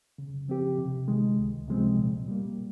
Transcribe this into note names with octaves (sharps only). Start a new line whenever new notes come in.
C#3
F3 C4 G4
C3
D#3 G#3
C#2
C3 F3 G#3 C4
A#2
G3 A#3